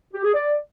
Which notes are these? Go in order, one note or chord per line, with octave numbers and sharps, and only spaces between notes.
G4
G#4
D5